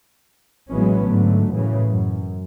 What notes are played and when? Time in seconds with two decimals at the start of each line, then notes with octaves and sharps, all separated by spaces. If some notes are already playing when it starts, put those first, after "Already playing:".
0.71 A1 E3 F#3 G#3 B3 C#4
1.04 G#2 D3 F#3 A3
1.53 F#2 A2 C#3 E3
1.89 F#2